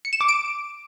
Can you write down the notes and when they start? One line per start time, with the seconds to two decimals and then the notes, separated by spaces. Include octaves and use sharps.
0.05 C#7
0.13 E7
0.21 D6
0.29 D7